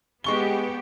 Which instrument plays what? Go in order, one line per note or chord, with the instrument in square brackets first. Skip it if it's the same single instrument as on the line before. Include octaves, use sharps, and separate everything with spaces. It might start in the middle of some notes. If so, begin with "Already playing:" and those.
[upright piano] G#3 C#6 G7 [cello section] B3 G4